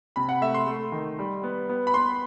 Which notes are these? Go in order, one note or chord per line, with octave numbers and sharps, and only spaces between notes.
C3 B5
F#5
A3 E5
C6
A3
D#3
G3
B3
B3
B5
B3 C6